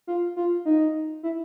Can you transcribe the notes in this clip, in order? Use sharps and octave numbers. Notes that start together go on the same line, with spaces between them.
F4
F4
D#4
E4